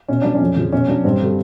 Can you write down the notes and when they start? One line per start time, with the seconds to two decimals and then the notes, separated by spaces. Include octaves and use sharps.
0.08 B2 C#4
0.22 F#3 D4
0.35 C#4
0.41 F2
0.56 C#3 F3
0.72 B2 C#4
0.88 F#3 D4
1.04 G2 C4
1.21 D3 G3